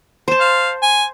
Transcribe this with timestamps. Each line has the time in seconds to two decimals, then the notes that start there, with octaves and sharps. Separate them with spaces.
0.28 C5 A5
0.40 F5
0.82 G#5